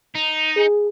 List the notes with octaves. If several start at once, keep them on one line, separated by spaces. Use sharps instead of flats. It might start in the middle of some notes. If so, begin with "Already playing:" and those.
D#4
G#4